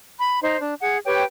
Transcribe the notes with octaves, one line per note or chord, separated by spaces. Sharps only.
B5
D#4 C5
D4
G#4 F#5
G4 B4 C#5 G5